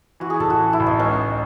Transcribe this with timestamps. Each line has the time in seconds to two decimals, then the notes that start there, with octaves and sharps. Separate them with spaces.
0.20 E3 F#4
0.30 G#4
0.40 A1 A4
0.50 F#4
0.60 E3
0.73 E4
0.80 A1
0.86 D#4
0.99 C#2 C#4
1.19 C#2